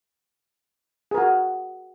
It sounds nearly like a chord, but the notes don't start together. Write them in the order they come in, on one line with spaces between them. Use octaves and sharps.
G#4 A#4 F#4